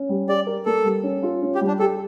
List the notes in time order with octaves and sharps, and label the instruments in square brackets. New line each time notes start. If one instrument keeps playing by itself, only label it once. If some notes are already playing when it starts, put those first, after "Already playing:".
Already playing: [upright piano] C#4
G3
[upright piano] G4 [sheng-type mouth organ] D5
[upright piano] A#4
[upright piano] A#3 [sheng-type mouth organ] A4
[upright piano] G3
C#4
F4
C#4
[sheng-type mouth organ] G4
[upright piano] G3
[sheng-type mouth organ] D4
[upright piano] G4 [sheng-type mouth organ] A4